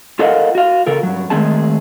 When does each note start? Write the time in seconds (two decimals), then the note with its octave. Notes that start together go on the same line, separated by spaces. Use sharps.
0.19 F4 A4 A#4 D#5 F5 F#5
0.55 F#4 F5
0.87 C#3 F4 A4 A#4
1.03 G2 F#3
1.30 D#3 G#3 A3 C4 G#4 A5